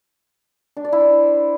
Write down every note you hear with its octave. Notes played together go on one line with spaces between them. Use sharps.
D4
D5
E4
C5